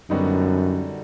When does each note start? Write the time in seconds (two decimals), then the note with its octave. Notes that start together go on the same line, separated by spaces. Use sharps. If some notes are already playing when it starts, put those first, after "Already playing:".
0.10 F#2 D3 G3 B3 D#4 F#4